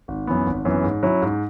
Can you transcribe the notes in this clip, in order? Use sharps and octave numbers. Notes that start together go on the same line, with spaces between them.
G#1
F#2 E3 B3
G#1
F#2 E3 B3
G#2
F#3 C#4 E4
G#2